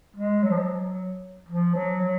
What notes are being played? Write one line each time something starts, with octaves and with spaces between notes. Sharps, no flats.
G#3
F#3
F3
F#3
F3
F#3
F#3